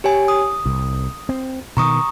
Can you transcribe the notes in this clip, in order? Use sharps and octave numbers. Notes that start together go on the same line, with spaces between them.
G4 C#5 G#5
D#6
C2
C4
B2 D#3 A#5 C#6 D#6